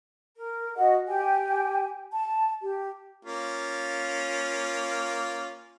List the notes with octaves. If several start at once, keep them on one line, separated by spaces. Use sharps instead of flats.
A#4
F#4 D#5 F#5
G4 G5 G#5
A5
G4
A#3 C#4 F4